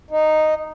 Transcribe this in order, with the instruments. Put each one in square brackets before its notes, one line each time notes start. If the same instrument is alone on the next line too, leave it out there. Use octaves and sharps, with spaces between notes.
[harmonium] D#4